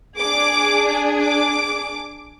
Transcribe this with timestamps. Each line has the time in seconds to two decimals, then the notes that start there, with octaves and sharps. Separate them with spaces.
0.19 D4 G#4 D6
1.22 D6